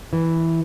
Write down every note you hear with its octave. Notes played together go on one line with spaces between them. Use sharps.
E3